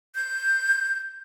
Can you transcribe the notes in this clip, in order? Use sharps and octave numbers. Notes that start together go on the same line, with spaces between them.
G6